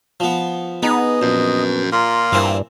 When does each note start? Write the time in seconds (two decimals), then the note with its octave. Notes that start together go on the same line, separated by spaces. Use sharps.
0.20 F3 B3
0.83 B3 D#4 G#4 D#5
1.22 A#1 F#2
1.92 A#2 F4 F5 A#5
2.32 G2 E3 A#3 C4